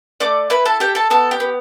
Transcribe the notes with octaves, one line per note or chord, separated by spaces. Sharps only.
A3 D5 D6
E4 B4 B5
A4 A5
G4 A4 G5
A4 A5
B3 A4 A5
G4 G5
B3